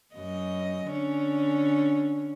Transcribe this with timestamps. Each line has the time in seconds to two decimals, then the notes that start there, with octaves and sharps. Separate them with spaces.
0.16 F#2 D#5
0.89 D3 C#4